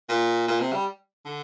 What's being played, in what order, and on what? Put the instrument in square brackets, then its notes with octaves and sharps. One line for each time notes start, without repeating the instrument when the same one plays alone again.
[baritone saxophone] A#2
A#2
C3
G3
D3